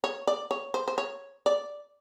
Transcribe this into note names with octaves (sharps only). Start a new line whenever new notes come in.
C#5
D5
C#5
C5
C5
C#5
D5